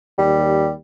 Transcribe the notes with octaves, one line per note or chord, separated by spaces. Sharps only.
D#2 G3